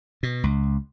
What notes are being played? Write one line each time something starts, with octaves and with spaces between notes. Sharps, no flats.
B2
C#2